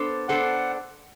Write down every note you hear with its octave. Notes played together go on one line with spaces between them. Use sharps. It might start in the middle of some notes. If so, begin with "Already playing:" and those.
Already playing: B3 D4 A4 C5
B3 D4 A4 C5 F#5